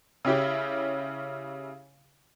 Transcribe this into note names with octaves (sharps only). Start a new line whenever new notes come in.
C#3 C#4 E4 G4